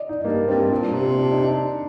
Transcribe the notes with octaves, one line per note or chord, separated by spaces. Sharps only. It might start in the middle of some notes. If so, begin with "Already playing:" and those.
Already playing: D5 D#5
D#4
G2 A#3
G2 C4
A#2 D4
C3
D4
D#4
D4